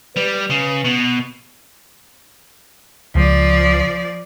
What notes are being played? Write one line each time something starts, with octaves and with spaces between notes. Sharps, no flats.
G3 B4
C#3
B2
C#2 F3 D5